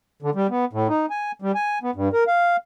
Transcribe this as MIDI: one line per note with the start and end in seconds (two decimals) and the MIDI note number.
0.22 0.30 50
0.35 0.47 55
0.50 0.65 59
0.73 0.88 45
0.89 1.06 63
1.10 1.32 80
1.42 1.52 55
1.55 1.78 80
1.83 1.91 59
1.95 2.09 43
2.13 2.24 70
2.27 2.56 77